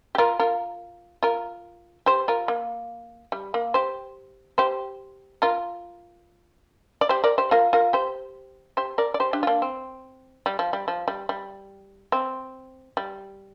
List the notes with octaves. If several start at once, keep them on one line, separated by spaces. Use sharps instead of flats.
G4
F4 A#4
F4 A#4
F4 A#4
G4 C5
F4 A#4
A#3
G3
A#3
G4 C5
G4 C5
F4 A#4
D5
G4 C5
A#4 D5
G4 C5
F4 A#4
F4 A#4
G4 C5
G4 C5
A#4 D5
D5
G4 C5
D4 G4
F4
A#3 D4
C4
G3
F3
G3
F3
G3
G3
C4
G3